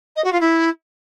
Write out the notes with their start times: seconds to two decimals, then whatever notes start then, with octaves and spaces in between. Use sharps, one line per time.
0.16 D#5
0.24 F#4
0.33 F4
0.41 E4